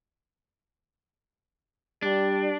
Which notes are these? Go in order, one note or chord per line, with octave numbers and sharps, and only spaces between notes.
G3 D4